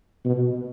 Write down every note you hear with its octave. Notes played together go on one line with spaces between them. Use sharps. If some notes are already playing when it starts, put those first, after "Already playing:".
B2